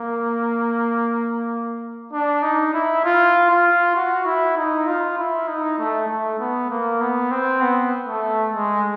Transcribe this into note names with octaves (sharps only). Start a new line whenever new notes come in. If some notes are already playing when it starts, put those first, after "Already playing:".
Already playing: A#3
D4
D#4
E4
F4
F4
F#4
E4
D#4
F4
E4
D#4
A3
A3
B3
A#3
B3
C4
B3
A3
G#3